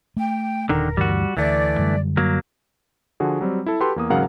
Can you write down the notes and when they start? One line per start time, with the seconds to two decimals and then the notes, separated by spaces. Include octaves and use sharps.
0.17 A3 G5
0.69 D#1 D3 D#3 A#4
0.97 D2 G2 E3 G3 F#4
1.37 D2 E3 A3 D5
1.78 F#2 D3 G3
2.17 F#3 A#3
3.20 D3 F3 F#4 G#4
3.41 F#3 G3 C4
3.66 E4 A4
3.80 F#4 G4 A4 B4 C6
3.96 E2 A#3 D#6
4.10 G#1 C#3 F#3 A#4 F5 F#5